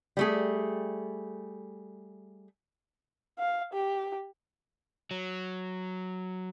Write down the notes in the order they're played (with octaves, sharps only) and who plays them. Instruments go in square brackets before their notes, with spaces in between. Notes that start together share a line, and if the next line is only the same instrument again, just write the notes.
[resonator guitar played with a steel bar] G3 A3 G#4
[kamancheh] F5
G4
[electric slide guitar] F#3